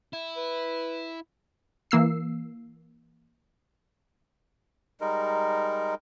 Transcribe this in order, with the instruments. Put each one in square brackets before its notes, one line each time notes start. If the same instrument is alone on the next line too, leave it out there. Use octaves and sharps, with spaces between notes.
[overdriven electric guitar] E4
[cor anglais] B4
[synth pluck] E3 A#3 E6 C7
[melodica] G3 G#3 D#4 A#4